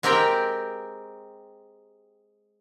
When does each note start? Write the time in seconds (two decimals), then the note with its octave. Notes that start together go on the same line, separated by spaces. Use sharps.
0.03 G#3 C4 G4 A#4 G5